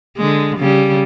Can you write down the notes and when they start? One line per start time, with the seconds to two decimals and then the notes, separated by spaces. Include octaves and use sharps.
0.17 D3 G#3
0.58 C#3 G3